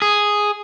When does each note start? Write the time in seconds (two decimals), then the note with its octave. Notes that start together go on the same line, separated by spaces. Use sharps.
0.02 G#4